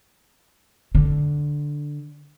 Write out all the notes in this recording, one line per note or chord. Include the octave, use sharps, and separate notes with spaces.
D3